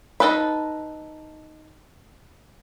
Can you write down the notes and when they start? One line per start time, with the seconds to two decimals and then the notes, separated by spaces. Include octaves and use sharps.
0.20 D#4 E4 A4 B4 B5